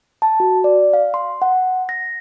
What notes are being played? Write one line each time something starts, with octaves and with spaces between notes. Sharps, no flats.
A5
F#4
D5
F5
C6
F#5
A#6